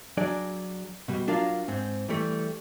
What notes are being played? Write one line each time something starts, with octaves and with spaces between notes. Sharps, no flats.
F#3 D4 G#4 D5
B2 G3
F#3 D4 F4 A#4 F5
G#2 C4
E3 G3 A3